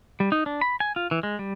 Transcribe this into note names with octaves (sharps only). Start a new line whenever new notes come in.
G3
D#4
D4
B5
G#5
F4
E3
G#3
G3